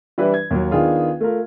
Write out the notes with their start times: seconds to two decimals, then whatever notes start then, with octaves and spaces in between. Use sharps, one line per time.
0.18 E3 G3 D4 E4 B4
0.34 G#6
0.51 D#2 F#3
0.71 D#3 B3 D4 F4 G#4
1.21 A3 F4 A#4